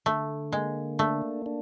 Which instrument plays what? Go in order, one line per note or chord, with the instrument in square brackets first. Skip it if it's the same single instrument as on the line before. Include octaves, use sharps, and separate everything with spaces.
[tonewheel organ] D3 [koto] A3
[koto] G#3 [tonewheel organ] A#3
[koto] A3 [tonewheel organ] D4
[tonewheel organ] D4